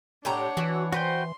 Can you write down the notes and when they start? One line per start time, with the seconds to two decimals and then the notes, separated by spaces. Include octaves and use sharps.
0.25 A2 D4 G4 C#5 F#5 A#5
0.57 E3 F#4
0.92 F#4 B4 C5 G5 C6